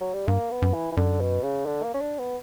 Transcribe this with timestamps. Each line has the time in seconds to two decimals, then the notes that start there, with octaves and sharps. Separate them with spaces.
0.01 F#3
0.14 G3
0.28 G2 A#3
0.51 B3
0.62 F#2
0.74 E3
0.92 E3
0.97 F#2 D3
1.21 B2
1.43 C#3
1.66 D3
1.83 A#3
1.94 C#4
2.01 D4
2.19 B3